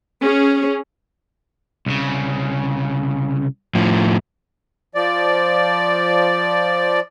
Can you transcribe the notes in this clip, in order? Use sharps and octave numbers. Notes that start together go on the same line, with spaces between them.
C#4 G#4
C2 C#3
A2 F3
F3 D5